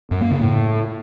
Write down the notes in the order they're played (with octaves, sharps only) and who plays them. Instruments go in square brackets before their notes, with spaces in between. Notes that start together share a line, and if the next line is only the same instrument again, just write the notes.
[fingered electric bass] F#2
A#3
C#3
A2